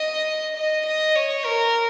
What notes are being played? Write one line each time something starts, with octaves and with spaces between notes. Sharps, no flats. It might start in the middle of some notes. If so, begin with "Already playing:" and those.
Already playing: D#5
D#5
D#5
C#5
A#4